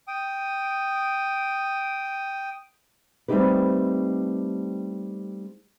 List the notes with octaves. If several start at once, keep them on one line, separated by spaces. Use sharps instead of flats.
G5 D#6
G3 A3 C4 D#4 G4 B4